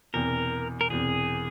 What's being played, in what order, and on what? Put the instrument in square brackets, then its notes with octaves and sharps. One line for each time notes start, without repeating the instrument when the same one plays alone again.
[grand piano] E1 E2 C3 [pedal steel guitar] A#4
[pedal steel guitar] A#4
[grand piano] E1 E2 C3 [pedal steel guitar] G#4